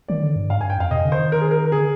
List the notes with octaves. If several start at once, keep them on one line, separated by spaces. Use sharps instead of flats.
D#3 D5
D3
G2
G#2 F5
G2 G#5
G5
F2 F5
C3 D#5
D3
C5
D#3
A#4
G#4
A#4
A#4
D3 G#4